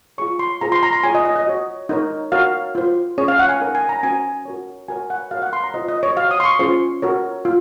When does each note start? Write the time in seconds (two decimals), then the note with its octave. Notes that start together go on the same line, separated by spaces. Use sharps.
0.18 F4 G#4 C#5 C#6
0.39 C6
0.61 F4 G#4 C5 A#5
0.72 C6
0.83 A#5
0.93 C6
1.03 F4 G#4 C#5 G#5
1.15 D#5
1.25 D#5
1.36 D#5
1.47 F#4 C#5
1.89 D#4 A#4 C#5
2.32 F#4 A#4 C#5 F5
2.75 F4 C5
3.18 C#4 G#4 C#5
3.28 F5
3.39 F#5
3.49 G#5
3.60 D#4 A#4 C#5
3.75 G#5
3.89 A#5
4.03 C#4 F#4 C5 G#5
4.45 F#4 A#4 C#5
4.88 F#4 A#4 C#5 G#5
5.10 F#5
5.31 F#4 A#4 C#5 F5
5.42 F#5
5.53 C6
5.64 A#5
5.74 F4 C5 D#5
5.88 D#5
6.03 C#5
6.17 F#4 C5 F5
6.31 D#6
6.40 C6
6.45 C#6
6.59 C#4 F4 G#4 C5 C6
7.02 F#4 A#4 C#5
7.45 F4